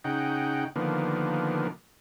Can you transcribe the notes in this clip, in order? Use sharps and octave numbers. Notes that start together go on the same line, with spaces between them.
C#3 D#4 F#5 G5
D3 D#3 F3 A#3 B3